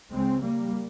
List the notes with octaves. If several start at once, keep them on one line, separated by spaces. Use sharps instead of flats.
C#2 C#3 G#3 C4
G3 A#3